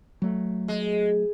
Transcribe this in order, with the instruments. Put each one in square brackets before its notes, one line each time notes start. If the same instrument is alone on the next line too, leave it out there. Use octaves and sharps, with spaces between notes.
[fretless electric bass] F#3 A3
[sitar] G#3